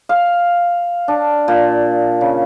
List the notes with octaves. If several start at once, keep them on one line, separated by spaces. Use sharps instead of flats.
F5
D4
A#2
C#3